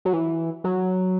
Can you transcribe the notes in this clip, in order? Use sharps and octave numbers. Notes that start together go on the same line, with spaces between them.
F#3
E3
F#3